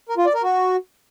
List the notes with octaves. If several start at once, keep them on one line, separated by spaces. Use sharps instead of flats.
A#4
F4
D5
A#4
F#4